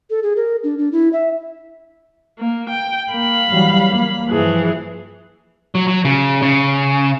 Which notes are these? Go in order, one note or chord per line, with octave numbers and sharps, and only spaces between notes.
A4
G#4
A#4
D4
D4
E4
E5
A#3
G5
A#3 F5 B5
E3 F#3 G3
A#3
G2 E3 F3 G#4
F#3
F#3
C#3
C#3